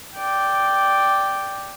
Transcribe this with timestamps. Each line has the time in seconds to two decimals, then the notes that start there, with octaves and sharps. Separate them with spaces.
0.16 D5 G5